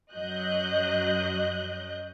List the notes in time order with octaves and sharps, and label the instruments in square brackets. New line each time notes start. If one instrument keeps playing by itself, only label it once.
[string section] F#2 F#3 D#5 F#6 G6